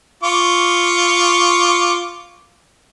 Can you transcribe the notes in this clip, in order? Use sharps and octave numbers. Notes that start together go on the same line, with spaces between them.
F4 C#6 D6